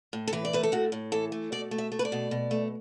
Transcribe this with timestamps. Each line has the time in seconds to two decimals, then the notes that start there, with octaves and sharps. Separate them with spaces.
0.13 A2
0.28 A4
0.33 E3 B4
0.45 D5
0.53 A3 B4
0.63 A4
0.72 A2 F#4
0.92 A2
1.12 E3 A4
1.32 A3
1.52 B2 D5
1.71 A3
1.78 E5
1.92 A3
1.99 B4
2.05 D5
2.12 B2
2.31 B2
2.51 A3